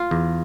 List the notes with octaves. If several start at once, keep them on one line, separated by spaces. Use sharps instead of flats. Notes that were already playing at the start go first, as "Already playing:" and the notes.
Already playing: F4
E2